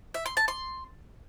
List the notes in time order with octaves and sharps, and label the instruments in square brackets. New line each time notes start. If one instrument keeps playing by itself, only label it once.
[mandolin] E5
C6
A5
C6